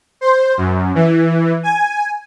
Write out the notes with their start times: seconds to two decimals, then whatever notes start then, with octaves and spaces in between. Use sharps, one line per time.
0.21 C5
0.57 F#2
0.95 E3
1.63 G#5